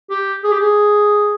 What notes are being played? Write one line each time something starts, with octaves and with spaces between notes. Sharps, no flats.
G4
G#4
G4
G#4